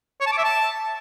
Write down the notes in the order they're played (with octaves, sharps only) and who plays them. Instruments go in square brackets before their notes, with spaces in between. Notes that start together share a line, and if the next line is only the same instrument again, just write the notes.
[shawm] C#5
A5
D6
E5
A5